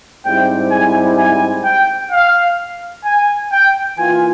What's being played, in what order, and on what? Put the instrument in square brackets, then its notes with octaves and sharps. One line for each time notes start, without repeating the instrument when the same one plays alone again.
[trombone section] G#2 G3 C4 E4 G4 [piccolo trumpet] G5
[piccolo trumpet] G#5
G#5
G5
F5
G#5
G5
[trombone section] E3 A#3 F4 [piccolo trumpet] G#5